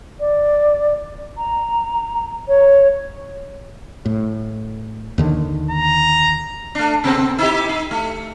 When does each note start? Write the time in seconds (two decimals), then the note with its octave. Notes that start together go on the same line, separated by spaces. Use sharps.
0.20 D5
1.38 A#5
2.48 C#5
4.05 A2
5.18 D#2 D3 D#3
5.70 A#5
6.75 A3 D4
7.04 C3 B3 C4
7.39 D#4 E4 G4
7.69 D#4
7.91 A3